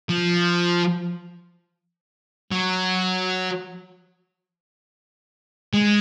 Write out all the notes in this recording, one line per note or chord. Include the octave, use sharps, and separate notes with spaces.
F3
F#3
G#3